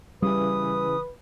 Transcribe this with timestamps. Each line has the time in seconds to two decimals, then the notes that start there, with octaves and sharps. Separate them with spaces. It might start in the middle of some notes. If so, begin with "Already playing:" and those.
0.22 C#3 E3 G3 B4 D#6